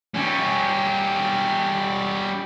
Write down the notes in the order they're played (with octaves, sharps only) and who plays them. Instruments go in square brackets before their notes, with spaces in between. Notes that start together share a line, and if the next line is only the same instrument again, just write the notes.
[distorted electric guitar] G3 C#4